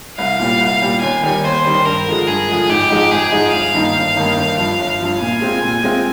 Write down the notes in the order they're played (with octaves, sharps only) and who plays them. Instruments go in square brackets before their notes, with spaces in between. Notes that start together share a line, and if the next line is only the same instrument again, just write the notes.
[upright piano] C2 [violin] F5
[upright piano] A#2 G3
C2
A#2 G3
[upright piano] D#2 [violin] G#5
[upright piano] D#3 G3
[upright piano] D#2 [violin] C5
[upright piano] D#3 G3
[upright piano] G2 [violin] A#4
[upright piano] D3 F3 G#3
[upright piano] G2 [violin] G#4
[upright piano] D3 F3 G#3
[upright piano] G#1 [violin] G4
[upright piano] G#2 F3 G#3 D#4
[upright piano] G#1 [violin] G#4
[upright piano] G#2 F3 G#3 D#4
[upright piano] G1 [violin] F5
[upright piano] G2 D#3 A#3 D#4
G1
G2 D#3 A#3 D#4
G1
G2 F3
G1
G2 F3
[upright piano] A#2 [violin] G#5
[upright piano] G#3 C4 F4
A#2
G#3 C4 F4